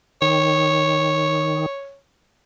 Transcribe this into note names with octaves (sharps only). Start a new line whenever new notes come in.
D#3 C#5